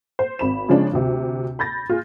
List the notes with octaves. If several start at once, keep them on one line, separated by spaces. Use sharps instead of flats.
C5
G#1 B5 E7
C#3 F3 G#3 C#4 D4
D2 C3
B5 G6 A6 A#6
F4 G#4